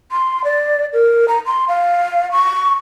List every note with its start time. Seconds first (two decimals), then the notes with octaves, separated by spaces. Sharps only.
0.12 C6
0.44 D5
0.93 A#4
1.28 A#5
1.46 C6
1.68 F5
2.32 C#6